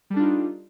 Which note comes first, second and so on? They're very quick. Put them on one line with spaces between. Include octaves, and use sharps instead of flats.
G3 A4 D4 F4 D#4